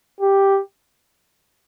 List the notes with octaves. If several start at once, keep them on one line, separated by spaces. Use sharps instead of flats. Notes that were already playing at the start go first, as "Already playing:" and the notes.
G4